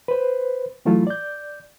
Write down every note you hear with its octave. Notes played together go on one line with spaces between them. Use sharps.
B4 C5
E3 F#3 A3 E4 F4
D5 G6